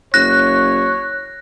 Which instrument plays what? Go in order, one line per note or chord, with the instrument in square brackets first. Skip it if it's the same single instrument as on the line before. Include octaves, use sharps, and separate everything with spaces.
[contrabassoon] F#1 [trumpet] C#5 [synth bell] F#6 [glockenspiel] A#6